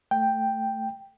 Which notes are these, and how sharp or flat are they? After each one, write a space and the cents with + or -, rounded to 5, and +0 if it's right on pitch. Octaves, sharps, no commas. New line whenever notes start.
A3 +10 G5 +0